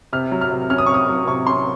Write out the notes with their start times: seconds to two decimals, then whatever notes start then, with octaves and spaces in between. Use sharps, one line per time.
0.13 C3 F6
0.31 F#3
0.41 F6
0.50 C3
0.70 C#4 F6
0.78 D#6
0.86 C3 C#6
0.94 D#6
1.09 F#3
1.27 C3 C#6
1.47 C#4 C6